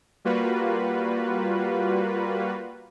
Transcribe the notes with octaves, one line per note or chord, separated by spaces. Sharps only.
G3 A#3 F4 F#4 B4